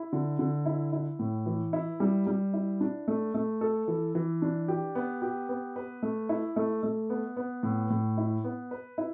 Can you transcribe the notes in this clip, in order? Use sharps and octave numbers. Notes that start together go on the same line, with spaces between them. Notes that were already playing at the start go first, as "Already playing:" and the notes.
Already playing: E4
D3
D3
E4
E4
A2
E3
E4
G3
G3
E4
D4
A3
A3
A4
E3
E3
D4
G4
B3
G4
B3
B4
A3
E4
A3
A3
B3
B3
A2
A2
E4
B3
B4
E4